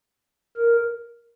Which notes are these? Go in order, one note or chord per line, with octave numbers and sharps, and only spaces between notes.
A#4